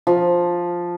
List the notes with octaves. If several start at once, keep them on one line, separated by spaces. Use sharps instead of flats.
F3